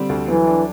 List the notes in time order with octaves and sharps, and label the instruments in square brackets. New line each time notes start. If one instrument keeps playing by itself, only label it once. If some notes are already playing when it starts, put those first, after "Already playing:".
Already playing: [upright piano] D3 G3 C4
D2
[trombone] E3 [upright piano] F#3
[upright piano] D4